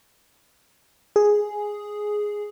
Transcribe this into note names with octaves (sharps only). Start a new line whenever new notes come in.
G#4